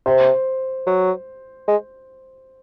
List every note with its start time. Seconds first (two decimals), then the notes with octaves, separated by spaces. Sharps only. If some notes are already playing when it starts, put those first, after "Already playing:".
0.06 C3 C5
0.87 F#3
1.68 G#3